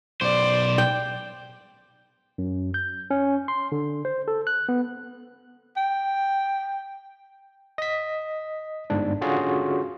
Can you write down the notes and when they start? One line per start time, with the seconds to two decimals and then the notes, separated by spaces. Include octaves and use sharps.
0.21 B1 C5 D5
0.78 G5
2.38 F#2
2.74 G6
3.11 C#4
3.48 C6
3.72 D3
4.05 C5
4.28 A4
4.47 F#6
4.69 B3
5.77 G5
7.78 D#5 B6
8.90 G1 G#2 D4
9.21 D3 C#4 F4 F#4 G#4